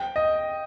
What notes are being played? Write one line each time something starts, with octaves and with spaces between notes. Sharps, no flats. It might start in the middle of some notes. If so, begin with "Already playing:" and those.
Already playing: G5
D#5